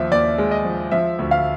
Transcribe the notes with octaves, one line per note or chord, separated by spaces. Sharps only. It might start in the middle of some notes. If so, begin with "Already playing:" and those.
Already playing: D#2 F3 E5
D#2 D5
G#3
D#5
F3
F3 E5
D2
F5